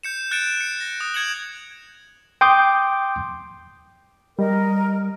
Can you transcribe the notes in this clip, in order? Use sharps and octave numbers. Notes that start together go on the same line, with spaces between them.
G6 C#7 E7
F#6 A6 C#7 D7 E7
C#7
A#6
D#6
F#6 G#6 C#7 E7 F#7
G5 C6 D6 D#6 G6
G3 A#4 D#5